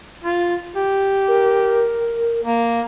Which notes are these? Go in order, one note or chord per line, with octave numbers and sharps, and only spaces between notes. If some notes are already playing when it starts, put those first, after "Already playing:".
F4
G4
A#4
A#3